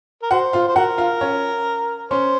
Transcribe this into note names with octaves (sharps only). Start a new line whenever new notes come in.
A#4
F#4 C5 F#5
F4 F5
C5
F#4 A#4 F#5
F4 F5
C#4 C#5
C#4 C5 C#5